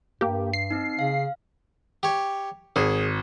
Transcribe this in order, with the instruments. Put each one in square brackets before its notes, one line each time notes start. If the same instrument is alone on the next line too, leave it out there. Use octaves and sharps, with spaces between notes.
[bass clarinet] G2 [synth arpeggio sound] A#3 G4
[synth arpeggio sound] C7
[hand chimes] C4 D#4
[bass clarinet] C#3 [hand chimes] F5
[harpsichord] G4 C#5
[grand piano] G#1 [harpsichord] G#4